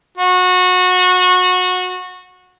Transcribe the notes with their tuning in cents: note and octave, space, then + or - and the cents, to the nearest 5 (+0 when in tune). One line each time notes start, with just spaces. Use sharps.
F#4 -20